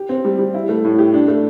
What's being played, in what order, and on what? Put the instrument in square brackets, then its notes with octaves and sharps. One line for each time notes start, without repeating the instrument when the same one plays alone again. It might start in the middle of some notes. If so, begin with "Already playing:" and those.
Already playing: [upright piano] G4
C4
G3
G3
E4
A3
A2
G4
D4
A3